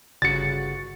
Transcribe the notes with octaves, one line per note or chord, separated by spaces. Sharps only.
G1 C#3 F#4 A6 C#7